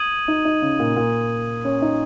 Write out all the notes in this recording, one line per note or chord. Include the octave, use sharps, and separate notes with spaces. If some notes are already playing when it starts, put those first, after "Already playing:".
Already playing: D#6 G#6 D#7 F#7
D#4
D#4
C#3
A#2
A#2
C#4
D#4